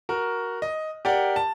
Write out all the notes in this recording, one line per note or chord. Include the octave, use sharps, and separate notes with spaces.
F#4 A#4
D#5
G4 A#4 D5 F#5
A5